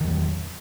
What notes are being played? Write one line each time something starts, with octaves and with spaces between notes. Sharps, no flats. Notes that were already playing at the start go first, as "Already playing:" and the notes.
E2 D#3 F#3